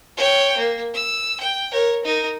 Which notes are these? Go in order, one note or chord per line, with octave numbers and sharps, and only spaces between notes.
C#5 G5
A#3
E6
G5
A#4 C#5
D#4 A#4